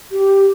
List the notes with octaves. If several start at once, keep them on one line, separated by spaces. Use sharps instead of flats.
G4